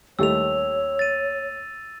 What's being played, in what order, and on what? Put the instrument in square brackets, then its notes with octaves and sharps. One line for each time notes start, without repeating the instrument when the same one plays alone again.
[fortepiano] D#2 G3 A3 [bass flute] C#5 [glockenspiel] E6 F7
[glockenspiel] A6 D#7